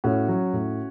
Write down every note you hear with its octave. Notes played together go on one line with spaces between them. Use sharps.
A2 C#4 F#4
F#3
A2